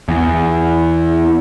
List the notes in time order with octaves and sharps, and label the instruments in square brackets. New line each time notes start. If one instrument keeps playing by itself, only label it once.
[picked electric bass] E2